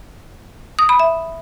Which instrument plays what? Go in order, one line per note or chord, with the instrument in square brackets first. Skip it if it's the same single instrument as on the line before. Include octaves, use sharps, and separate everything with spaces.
[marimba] D#6
B5
E5